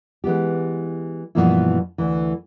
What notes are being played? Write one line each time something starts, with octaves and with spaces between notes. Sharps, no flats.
E3 G#3 B3 G4
G2 B2 E3 F3 A#3 E4
D2 E3